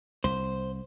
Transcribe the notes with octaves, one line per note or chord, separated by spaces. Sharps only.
C2 C5